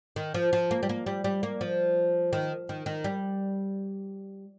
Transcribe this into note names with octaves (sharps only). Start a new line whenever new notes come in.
D#3
F3
F3
A#3
G3
A#3
G3
G3
A#3
F3
D#3
D#3
D#3
G3